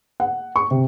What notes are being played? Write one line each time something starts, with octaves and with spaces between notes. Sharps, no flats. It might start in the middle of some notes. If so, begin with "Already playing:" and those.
F#5
C#6
C3